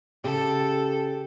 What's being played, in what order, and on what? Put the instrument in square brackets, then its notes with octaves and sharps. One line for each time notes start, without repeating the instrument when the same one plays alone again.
[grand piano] C#3 [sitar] G4 [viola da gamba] A4